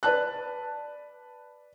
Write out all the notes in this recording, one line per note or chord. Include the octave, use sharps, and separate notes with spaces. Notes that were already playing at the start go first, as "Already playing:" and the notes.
B4 D5 A5 F#6